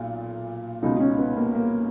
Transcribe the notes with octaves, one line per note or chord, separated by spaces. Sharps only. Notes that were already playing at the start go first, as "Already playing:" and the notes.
Already playing: B1 A#2
C#2 B2 D#4
D#4
C#4
B3
A#3
A#3